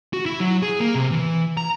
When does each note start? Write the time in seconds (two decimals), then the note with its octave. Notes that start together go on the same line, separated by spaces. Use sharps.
0.13 F#4
0.26 E4
0.40 F#3
0.63 G#4
0.80 A#3
0.95 C3
1.12 E3
1.57 A#5